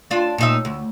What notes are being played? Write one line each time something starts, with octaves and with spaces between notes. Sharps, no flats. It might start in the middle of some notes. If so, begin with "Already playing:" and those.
D4 F4
A#2 D#4 E5
D2